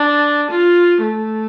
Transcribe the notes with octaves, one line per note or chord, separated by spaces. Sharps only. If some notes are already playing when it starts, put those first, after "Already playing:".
Already playing: D4
F4
A3